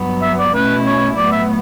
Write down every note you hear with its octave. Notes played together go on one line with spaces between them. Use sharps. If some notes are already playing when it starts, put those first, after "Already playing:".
Already playing: G2 F#3 B3
E5
D5
B2 A3 C#4 E4 B4
C#5
A2 F#3 B3 D5
E5